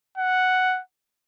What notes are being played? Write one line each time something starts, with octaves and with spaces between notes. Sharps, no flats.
F#5